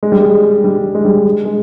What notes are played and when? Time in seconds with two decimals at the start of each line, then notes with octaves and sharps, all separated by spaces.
0.03 G#3
0.12 G3
0.21 G#3
0.64 G3
0.95 G#3
1.05 G3
1.45 G#3